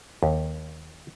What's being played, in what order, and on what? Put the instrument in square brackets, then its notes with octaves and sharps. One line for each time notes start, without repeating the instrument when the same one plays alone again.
[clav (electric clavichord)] D#2